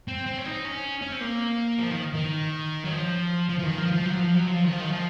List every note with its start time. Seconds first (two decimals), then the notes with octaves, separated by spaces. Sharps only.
0.08 C4
0.26 C4
0.37 C#4
0.46 D#4
0.65 C#4
1.02 C#4
1.12 C4
1.21 A#3
1.78 F3
1.91 D#3
2.14 D#3
2.85 F#3
2.93 F3
3.49 F3
3.59 F3
3.63 D#3
3.78 F3
3.92 F3
4.06 F#3
4.20 F3
4.34 F#3
4.47 F3
4.64 D#3
4.71 F3
4.80 D#3
4.92 F3